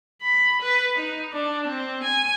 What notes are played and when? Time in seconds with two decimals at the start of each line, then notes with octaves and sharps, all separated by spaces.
0.22 B5
0.62 B4
0.95 D#4
1.33 D4
1.68 C4
2.04 G#5